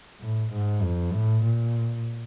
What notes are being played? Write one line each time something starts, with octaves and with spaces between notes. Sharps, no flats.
A2
G#2
F2
A2
A#2